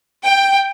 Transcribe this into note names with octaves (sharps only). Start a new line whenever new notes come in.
G5